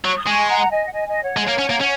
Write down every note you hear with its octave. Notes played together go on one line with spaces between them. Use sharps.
F#3 C#6
D#6
G#3 G#5 C#6
F#5 A#5
D#5 G#5
F#5
D#5 G#5
D#5 G#5
C#5 F#5
G#3
A#3
C#4
A#3
C#4